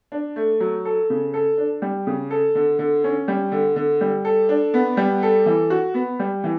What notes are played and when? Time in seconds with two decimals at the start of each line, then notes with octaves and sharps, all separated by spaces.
0.12 D4
0.36 A3
0.60 F#3
0.85 A4
1.10 C#3
1.34 A4
1.58 D4
1.82 G3
2.07 C#3
2.31 A4
2.55 D3
2.79 D3
3.04 C#4
3.28 G3
3.52 D3
3.76 D3
4.01 G3
4.25 A4
4.49 D4
4.74 B3
4.97 G3
5.23 A4
5.46 E3
5.70 F#4
5.94 B3
6.20 G3
6.44 E3